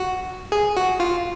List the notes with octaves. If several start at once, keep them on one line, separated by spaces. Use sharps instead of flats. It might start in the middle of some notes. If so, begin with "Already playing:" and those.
Already playing: F#4
G#4
F#4
F4